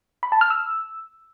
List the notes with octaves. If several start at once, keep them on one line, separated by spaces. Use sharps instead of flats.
B5
A5
F6
E6